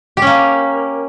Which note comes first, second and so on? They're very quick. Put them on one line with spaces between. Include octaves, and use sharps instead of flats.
G4 C#4 A#3